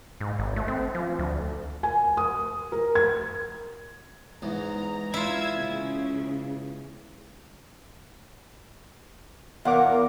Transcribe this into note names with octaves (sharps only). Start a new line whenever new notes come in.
G#2
G#1
A3
C4
F3
D2
G#5
D#6
A#4
G#6
E2 G#2 A#5
E4 F4 E6 G#6
C#3
E2 A#4 F5 F#5 D6